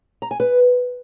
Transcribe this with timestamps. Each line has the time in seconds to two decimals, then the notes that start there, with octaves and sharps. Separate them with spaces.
0.22 A#5
0.31 G#5
0.40 B4